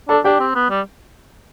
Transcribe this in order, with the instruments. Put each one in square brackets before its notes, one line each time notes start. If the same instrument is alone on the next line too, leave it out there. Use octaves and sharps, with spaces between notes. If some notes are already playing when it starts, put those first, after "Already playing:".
[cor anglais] D4 [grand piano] A4 A5
[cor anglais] D4 [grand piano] G4 G5
[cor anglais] C4
B3
G3